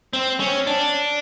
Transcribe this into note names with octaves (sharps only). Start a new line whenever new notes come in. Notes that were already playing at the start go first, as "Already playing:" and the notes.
C4
C#4
D4